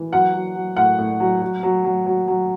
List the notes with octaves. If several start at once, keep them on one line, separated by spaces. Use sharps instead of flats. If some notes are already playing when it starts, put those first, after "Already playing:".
Already playing: E3
F#3 F#5
F#3
F#3
A2 F#5
A2
F#3
F#3
F#3
F#3
F#3
F#3